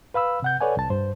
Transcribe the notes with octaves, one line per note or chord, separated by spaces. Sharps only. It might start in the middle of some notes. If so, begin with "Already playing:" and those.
B4 F5 B5 E6
C3 F#5 G6
A4 B4 C#5 D5 F#5 G#5
C2 A5
G2 C5